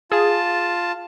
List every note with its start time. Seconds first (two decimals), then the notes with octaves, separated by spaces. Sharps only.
0.12 F4 G#4 A5